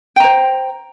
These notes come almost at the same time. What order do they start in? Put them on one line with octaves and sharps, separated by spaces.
G5 A#5 C5